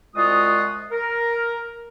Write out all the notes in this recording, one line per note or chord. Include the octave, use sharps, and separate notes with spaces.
C2 G#3 F4 F#4 D#6
A#4